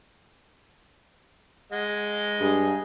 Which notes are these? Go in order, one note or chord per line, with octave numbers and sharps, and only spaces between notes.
G#3 D#5 F#5
G2 G#4